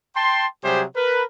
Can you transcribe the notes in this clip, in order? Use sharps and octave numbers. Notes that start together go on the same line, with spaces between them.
G5 A5 C6
C3 F#3 G3 G4 G#4 C5
A#4 B4